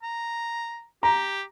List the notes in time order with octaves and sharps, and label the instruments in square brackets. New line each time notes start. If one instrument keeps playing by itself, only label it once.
[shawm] A#5
[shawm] G4 [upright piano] A#5